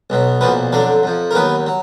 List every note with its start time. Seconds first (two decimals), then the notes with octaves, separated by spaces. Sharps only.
0.10 B1 B2 F#3
0.41 B1 A#2 F3 B3 B4
0.72 F2 D3 F#3 D4 D5
1.03 F2 F3
1.31 A#4
1.35 D#2 D#3 F#3 B3 B4
1.66 F#3